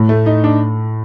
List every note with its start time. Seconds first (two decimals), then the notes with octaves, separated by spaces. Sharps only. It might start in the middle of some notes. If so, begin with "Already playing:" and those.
Already playing: A2
0.09 A3
0.26 D#4
0.44 D4